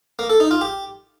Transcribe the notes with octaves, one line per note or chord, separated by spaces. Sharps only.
A#3
A4
D#4
F4
G4